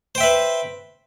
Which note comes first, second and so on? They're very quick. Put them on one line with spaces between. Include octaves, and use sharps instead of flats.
C5 G5 E5 B4